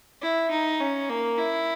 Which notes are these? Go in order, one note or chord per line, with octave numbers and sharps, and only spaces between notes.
E4
D#4
C#4
A#3
E4